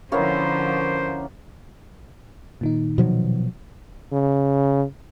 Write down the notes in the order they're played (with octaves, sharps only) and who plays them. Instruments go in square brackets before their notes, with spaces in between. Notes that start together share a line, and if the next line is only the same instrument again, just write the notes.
[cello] D3 F3 [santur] A#3 B3 C#5 [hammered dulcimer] C#4 E4 [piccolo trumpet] C5
[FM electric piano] A#2 D#3 D#4
[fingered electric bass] B2 F3 F#3
[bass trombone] C#3